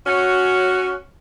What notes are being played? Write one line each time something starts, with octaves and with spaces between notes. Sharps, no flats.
C#4 F#4